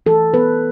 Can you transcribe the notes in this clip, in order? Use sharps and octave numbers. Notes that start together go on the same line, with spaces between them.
E3 A4
B3 B4